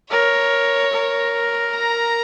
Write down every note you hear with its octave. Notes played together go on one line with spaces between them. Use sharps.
A#4 C#5
A#4
A#5